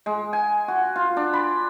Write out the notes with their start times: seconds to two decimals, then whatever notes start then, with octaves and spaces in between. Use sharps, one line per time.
0.06 G#3
0.33 G#5
0.68 F#4
0.96 F4
1.17 D4
1.33 B5